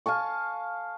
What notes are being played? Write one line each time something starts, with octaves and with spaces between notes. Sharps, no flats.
F5 G#5 A5 C#6